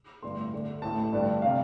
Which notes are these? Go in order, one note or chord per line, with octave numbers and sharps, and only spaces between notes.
A1 G2 D3 A3 C6
D2 D3 A3
A1 A2 A3 A5
A1 G2 D3 G3
C3 G3 F5